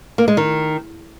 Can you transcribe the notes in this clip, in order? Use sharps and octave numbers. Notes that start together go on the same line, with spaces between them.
A#3
G#3
D#3